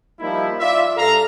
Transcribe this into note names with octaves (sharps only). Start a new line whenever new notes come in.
F3 G3 A#3 D#4 E4
F4 D5 E5
G2 A4 F5 A#5